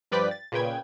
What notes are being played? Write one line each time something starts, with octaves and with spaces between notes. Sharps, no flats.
G2 F3 B4 D5 G5 B6
A6
A#2 C#3 B4 G5 G#6